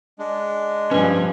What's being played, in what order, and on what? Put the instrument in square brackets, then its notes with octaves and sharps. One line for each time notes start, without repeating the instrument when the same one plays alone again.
[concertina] G#3 D4
[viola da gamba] G2 F3 [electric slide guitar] C#4 G#5 [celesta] B4